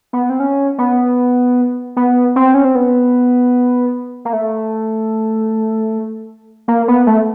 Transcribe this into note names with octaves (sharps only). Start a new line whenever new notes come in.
B3
C4
C#4
B3
B3
C4
C#4
C4
B3
A#3
A3
A#3
B3
A3